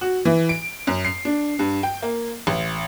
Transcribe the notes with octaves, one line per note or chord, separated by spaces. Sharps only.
F#4
E3
D7
F#2
C7
D4
G2
G5
A#3
A1